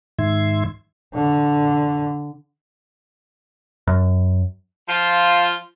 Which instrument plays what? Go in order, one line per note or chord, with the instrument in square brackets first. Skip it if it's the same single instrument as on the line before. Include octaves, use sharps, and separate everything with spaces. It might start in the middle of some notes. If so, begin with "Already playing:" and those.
[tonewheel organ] G#2 D#3 E5 C6 G#6
[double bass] D3
[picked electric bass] F#2
[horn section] F3 F4